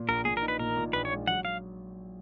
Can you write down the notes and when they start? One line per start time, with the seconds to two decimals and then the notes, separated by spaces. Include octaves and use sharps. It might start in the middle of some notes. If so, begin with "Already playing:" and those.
Already playing: A#2
0.08 A#1 A#4
0.25 A#2 G#4
0.37 A#4
0.42 D#4
0.48 B4
0.59 A#2 A#4
0.77 A#2
0.93 A#1 B4
1.05 C#5
1.11 G#3
1.27 F#3 F#5
1.45 F5